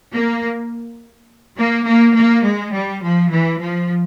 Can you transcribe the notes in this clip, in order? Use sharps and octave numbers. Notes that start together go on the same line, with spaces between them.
A#3
A#3
A#3
A#3
G#3
G3
F3
E3
F3